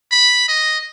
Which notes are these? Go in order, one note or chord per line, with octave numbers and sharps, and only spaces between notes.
B5
D#5